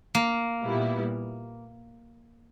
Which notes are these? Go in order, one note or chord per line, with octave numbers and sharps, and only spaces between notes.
A#3
A#2 G3 B3 E4